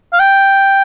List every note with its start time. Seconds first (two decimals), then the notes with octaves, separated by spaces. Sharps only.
0.13 F5
0.20 G5